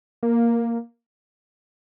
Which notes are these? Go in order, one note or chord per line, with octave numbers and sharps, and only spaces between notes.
A#3